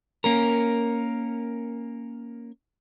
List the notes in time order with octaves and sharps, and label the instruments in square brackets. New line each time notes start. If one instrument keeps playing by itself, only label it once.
[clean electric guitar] A#3 C#4 A#4